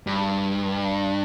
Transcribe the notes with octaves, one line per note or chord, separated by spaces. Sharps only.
G2